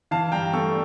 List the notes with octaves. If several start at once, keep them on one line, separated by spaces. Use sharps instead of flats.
E3 F5 A5
G2 G5 A#5
A3 C#6 E6